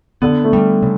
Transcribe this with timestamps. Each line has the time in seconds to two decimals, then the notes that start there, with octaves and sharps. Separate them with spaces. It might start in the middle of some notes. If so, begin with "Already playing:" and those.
0.22 D3 B3
0.44 A3
0.53 G3
0.83 C#3